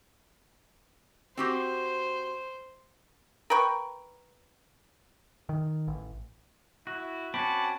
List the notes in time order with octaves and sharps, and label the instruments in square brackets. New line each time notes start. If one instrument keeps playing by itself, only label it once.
[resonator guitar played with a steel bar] C4 F#4 G4 [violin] C5
[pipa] A#4 B4 G5 C#6
[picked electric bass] D#3
A1
[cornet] E4 [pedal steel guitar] F#4
[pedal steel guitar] C4 C#4 F#4 [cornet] A5 [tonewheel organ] B5 D6